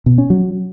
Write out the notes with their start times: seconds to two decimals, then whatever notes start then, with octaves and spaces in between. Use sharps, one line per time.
0.06 B2
0.18 C#4
0.30 F#3